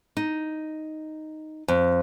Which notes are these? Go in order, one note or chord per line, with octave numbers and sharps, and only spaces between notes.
D#4
F2